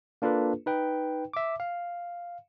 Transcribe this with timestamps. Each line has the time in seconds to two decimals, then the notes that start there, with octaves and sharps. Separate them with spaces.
0.22 A#3 D4 F4 A4 B4
0.66 D#4 B4 G5
1.34 E5 D6
1.60 F5